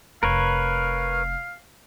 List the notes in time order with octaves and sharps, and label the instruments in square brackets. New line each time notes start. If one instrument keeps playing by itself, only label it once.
[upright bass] F1 [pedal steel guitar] A#4 B4 C#5 [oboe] F5